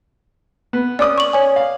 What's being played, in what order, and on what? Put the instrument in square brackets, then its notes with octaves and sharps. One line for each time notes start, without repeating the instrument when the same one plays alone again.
[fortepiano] B3
[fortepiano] C#4 D6 D#6 [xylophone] D5
[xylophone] C#6 F#7
C#5 G#5
[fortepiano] F5